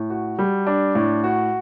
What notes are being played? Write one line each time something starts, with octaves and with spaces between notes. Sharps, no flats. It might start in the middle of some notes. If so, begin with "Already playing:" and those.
Already playing: A2
F#4
G3
D4
A2
F#4